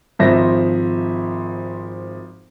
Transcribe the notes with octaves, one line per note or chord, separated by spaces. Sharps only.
G#1 F3 C5 E5 A#6